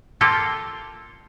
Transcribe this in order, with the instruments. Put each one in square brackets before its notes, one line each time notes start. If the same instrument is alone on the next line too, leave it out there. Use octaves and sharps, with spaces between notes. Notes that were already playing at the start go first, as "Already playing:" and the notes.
[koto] A#3 F4 G4 A4